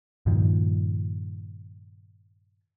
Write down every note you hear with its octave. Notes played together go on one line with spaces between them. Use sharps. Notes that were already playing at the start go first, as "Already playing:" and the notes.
G2 A#2 D#3 F3